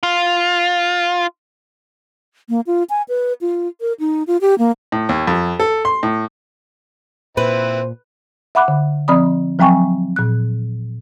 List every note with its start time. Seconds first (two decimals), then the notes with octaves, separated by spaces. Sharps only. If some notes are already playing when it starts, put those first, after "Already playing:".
0.03 F4
2.49 A#3
2.67 F4
2.90 G#5
3.09 B4
3.41 F4
3.81 A#4
4.00 D#4
4.27 F4
4.41 G4
4.58 A#3
4.92 A2
5.09 D#2
5.27 F2
5.60 A4
5.85 C6
6.03 A2
7.37 A#2 C4 E4 B4 C5
8.55 E5 F#5 B5 D6 F#6
8.68 D3
9.08 F3 C4 D5 B5 D#6
9.59 F3 F#3 C4 G5 G#5 C#6
10.16 A#2 F#6